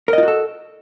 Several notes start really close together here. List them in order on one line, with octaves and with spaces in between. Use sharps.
A#4 D#5 F4 F#4 A4